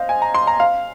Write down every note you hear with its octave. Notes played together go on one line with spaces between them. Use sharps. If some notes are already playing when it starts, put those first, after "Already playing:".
Already playing: C5 D#5 F5
G#5
A#5
C6
A#5
F5